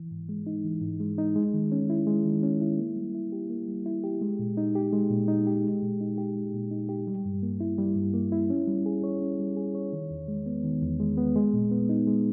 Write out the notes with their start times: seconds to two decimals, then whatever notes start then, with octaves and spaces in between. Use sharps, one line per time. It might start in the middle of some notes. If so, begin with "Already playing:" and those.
Already playing: E3
0.11 G#2
0.29 G#3
0.46 D#4
0.64 E3
0.82 G#2
1.00 G#3
1.18 D#4
1.35 G#3
1.54 D#3
1.72 C#4
1.90 E4
2.07 G#3
2.25 D#3
2.43 C#4
2.61 E4
2.78 A#3
2.96 G3
3.15 E4
3.32 G4
3.50 A#3
3.68 G3
3.86 E4
4.04 G4
4.21 G#3
4.39 A#2
4.57 D#4
4.75 G4
4.93 G#3
5.11 A#2
5.28 D#4
5.47 G4
5.64 G#3
5.82 A#2
6.00 D#4
6.18 G4
6.36 G#3
6.54 A#2
6.71 D#4
6.89 G4
7.07 G3
7.25 G2
7.43 A#3
7.60 E4
7.78 G3
7.96 G2
8.14 A#3
8.32 E4
8.50 C#4
8.68 G3
8.86 G#4
9.03 C#5
9.21 C#4
9.39 G3
9.57 G#4
9.75 C#5
9.93 D#3
10.10 E2
10.28 G#3
10.46 B3
10.64 D#3
10.82 E2
11.00 G#3
11.17 B3
11.36 G#3
11.54 A#2
11.71 B3
11.89 D#4
12.07 G#3